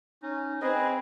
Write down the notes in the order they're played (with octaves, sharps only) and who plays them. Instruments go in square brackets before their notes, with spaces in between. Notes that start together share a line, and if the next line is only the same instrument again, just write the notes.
[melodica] C#4 [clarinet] D#4
[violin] C4 [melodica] G#4 B4 [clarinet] D#5